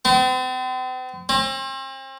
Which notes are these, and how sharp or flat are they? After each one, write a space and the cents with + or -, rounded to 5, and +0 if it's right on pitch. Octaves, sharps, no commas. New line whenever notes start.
C4 -40
C4 +40